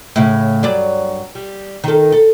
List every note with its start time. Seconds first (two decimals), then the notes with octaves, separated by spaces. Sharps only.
0.16 A2 C#3
0.63 G2 F#3 D5
1.35 G3
1.84 D#3 A4
2.12 A4